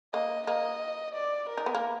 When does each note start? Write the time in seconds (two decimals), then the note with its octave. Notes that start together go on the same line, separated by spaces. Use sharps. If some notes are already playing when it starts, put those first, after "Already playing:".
0.13 A#3 D#5
0.47 A#3 D#5
1.15 D5
1.49 A#4
1.57 D#4
1.66 B3
1.75 A#3